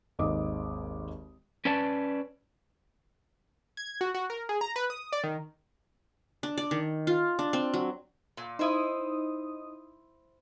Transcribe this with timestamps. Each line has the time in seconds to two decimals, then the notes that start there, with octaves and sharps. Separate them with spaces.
0.19 G#1 D#2 D#5 D6 D#6
1.65 C#4 B4 D5 A5
3.77 G#6
4.01 F#4
4.14 F#4
4.30 A#4
4.49 G#4
4.61 A#5
4.76 B4
4.90 D#6
5.13 D5
5.24 D#3
6.43 D4
6.58 D5
6.71 D#3
7.07 F4
7.39 D4
7.53 C4
7.74 F#3
8.37 A#2
8.59 D#4 E4 C5 D#6